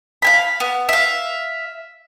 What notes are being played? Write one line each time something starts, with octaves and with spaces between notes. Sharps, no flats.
F5 G#5 B5
B3
E5 F5